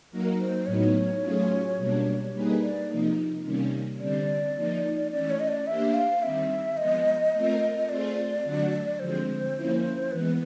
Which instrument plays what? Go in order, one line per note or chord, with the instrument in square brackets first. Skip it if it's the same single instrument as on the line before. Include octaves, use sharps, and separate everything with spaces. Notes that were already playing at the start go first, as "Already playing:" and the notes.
[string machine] F#3 A#3 D#4 F#4 A#4
[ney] C5
[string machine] A2 F#3 B3 D#4 [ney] C#5
[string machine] F#3 A3 C#4 F4 G#4
B2 G3 A#3 D4
G3 A#3 D#4 G#4 B4
[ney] D5
[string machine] C3 F3 A#3 D#4
C3 D#3 G3 A#3 C#4
[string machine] D3 G3 C4 [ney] D5
[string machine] F3 A#3 D#4
[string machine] E3 A3 C#4 [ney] D5
[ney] C#5
D#5
D5
[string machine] A#3 D4 G4 C5 [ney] E5
[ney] F5
[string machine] D#3 G3 C4 [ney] E5
[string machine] F3 G#3 B3 [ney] D#5
[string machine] A3 C4 F4 A#4
[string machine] A3 C4 F4 G#4 C5 [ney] D5
[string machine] D3 F#3 A3 D4 F#4
[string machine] D3 F3 G#3 C4 [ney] C5
[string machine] F3 A#3 C#4 E4
[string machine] E3 G#3 B3 [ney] B4